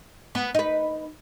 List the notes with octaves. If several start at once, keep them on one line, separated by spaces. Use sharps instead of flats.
B3
D#4 B4